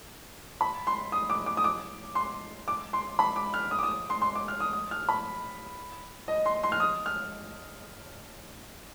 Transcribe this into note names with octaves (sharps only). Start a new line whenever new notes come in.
B5
C6
D#6
D6
D6
D#6
D6
C6
D6
C6
B5
D6
F6
D#6
D6
D#6
C6
C6
D6
F6
D#6
D#6
F6
B5
D#5
C6
C6
F6
D#6
F6